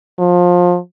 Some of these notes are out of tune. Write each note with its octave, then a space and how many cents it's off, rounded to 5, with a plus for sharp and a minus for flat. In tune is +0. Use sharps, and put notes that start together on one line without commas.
F3 +25